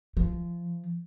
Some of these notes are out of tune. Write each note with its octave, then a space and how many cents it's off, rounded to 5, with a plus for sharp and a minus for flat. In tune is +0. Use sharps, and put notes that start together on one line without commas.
F3 -20